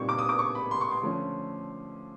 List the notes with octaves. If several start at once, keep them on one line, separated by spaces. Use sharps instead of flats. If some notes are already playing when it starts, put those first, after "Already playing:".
Already playing: A#2 G3 C4 D#4 C#6
D6
D#6
D6
C#6
B5
C6
C#6
C6
D3 F3 A3 C#4